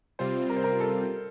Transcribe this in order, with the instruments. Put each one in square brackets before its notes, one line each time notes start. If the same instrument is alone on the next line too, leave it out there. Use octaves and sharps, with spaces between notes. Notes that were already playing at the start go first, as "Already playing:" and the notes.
[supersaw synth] C3 G3 C4 F4 [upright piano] C5
[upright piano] A#4
C5
A#4
A4